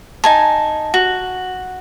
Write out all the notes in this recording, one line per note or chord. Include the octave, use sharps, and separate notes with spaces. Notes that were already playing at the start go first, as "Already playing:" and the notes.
D#4 G#5 A5
F#4